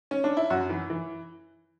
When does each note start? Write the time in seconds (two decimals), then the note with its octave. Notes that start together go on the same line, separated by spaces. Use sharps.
0.11 C#4
0.24 D4
0.37 E4
0.50 F#2 F#4
0.69 E3
0.90 E3